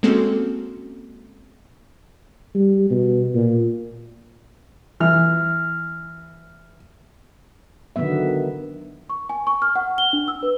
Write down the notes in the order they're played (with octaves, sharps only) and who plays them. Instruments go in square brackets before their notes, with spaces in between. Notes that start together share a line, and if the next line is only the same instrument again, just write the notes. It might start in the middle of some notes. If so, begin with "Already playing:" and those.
[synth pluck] G#3 A#3 C4 C#4 F#4 A4
[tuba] G3
B2
A#2
[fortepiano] E3 [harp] F6
[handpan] D3 D#3 F#3 B3 E5
[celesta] C#6
G#5
C#6
F6
F#5
G7
D4
E6
B4